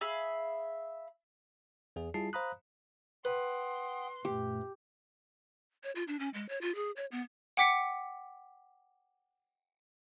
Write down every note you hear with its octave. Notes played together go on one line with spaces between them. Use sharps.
G#4 E5 F5 B5
E2 G#4
G3 E4 F4 G#4 A5 C7
C5 F5 A#5 B5 D#6 F#6
B4 F#5 G5 C6 D#6
F#2 A#2 A3 G4
C#5
F4
D4
C#4
G#3
C#5
F4
G#4
C#5
B3
F#5 G5 D6 B6 C#7